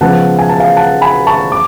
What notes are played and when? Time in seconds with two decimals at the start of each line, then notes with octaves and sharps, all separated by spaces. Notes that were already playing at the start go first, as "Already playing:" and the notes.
0.01 C#3 F3 G#3 B3 F#5 A5
0.38 G#5
0.49 A5
0.60 F5 G#5
0.76 F#5 A5
1.02 G#5 B5
1.27 A5 C#6
1.52 D6